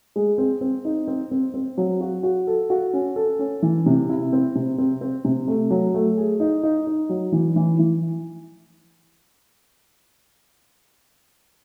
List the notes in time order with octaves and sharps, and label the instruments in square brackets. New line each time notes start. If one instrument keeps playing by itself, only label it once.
[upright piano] G#3
C4
C4
D#4
C4
C4
C4
F#3
F#4
F#4
A4
F#4
C#4
A4
C#4
E3
C3
E4
C4
C3
C4
C4
C3
A3
F#3
A3
G#4
D#4
D#4
D#4
F#3
E3
E3
E3